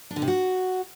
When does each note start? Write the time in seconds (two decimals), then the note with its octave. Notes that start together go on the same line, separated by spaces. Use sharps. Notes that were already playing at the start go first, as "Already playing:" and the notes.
0.11 D4
0.16 D3
0.22 C3
0.28 F#4